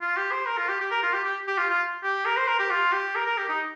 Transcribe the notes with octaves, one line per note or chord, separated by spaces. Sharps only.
F4
G4
C5
A#4
F4
G4
G4
A#4
F4
G4
G4
G4
F4
F4
G4
A#4
C5
A#4
G4
F4
G4
A#4
A#4
G4
D#4